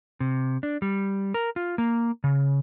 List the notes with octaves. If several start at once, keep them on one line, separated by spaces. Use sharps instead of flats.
C3
D4
G3
A#4
F4
A#3
C#3